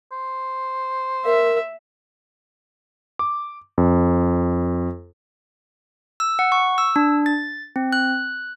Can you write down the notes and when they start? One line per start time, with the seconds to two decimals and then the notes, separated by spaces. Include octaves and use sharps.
0.12 C5
1.26 A#4 E5
3.19 D6
3.78 F2
6.20 E6
6.39 F#5
6.52 C#6
6.78 E6
6.96 D4
7.26 A6
7.76 C4
7.93 F#6